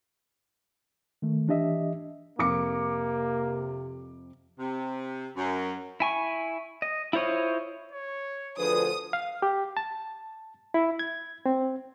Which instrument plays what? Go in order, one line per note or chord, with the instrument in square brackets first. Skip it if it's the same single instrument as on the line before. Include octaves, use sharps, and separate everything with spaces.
[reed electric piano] D#3 A3
E3 D4 G4 D#5 E5
[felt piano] F2 D6 C#7 [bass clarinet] C3 [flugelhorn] A#3
[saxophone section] C3
F#2
[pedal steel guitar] E4 G#5 C#6
D#5
E4 F4 C5 C#5 D#5
[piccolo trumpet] C#5
[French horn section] D2 D3 F3 [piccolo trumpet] G#4 [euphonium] B4 [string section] D#6
[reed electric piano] F5
G4
A5
E4
G#6
C4